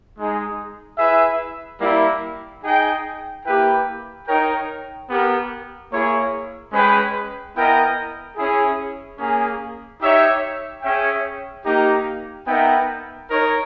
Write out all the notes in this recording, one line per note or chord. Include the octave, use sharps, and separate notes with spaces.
G#3 D#4 G#4
E4 G#4 B4 E5
G3 A#3 E4
D#4 G#4 D#5 G5
A#3 E4 G4 B4 G5
D#4 A#4 C#5 G5
B3 G4 A#4
A#3 E4 G#4 C#5
G#3 C#4 G#4 B4 G5
B3 E4 A#4 D#5 G5
C#4 E4 G#4
A#3 C#4 G#4
D#4 G4 C#5 E5 G5
C#4 G#4 C#5 E5 G5
A#3 D#4 G4
B3 D#4 A#4 E5 G5
D#4 A#4 C#5